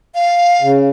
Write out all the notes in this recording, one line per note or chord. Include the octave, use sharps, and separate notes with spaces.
F5
C#3